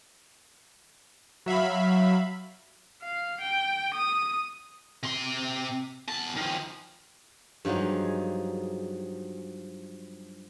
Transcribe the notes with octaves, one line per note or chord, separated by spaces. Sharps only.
F#3 E5 F5 B5
F5
G5
D#6
C3 C6
E2 A5
D#3 F3
G2 F3 F#3 D#4 G#4